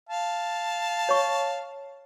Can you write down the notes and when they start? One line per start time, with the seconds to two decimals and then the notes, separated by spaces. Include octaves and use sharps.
0.09 F5 A5
1.09 C#5 C#6